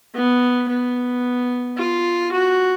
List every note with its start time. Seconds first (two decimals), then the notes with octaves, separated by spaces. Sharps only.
0.14 B3
0.69 B3
1.77 F4
2.32 F#4